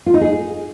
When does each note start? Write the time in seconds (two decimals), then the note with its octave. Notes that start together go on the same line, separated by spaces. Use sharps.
0.06 F4
0.14 D#4
0.21 G#4